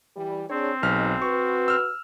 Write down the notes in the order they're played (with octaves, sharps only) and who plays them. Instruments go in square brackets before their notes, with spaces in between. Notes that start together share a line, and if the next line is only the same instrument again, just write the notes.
[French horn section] E3 G3
[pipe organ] C4 [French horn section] D4 G#4 C#5
[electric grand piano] B1 F6 [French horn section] G#2 D#4 B4
[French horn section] F#4 B4 [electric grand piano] C#6
[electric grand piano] E6 F6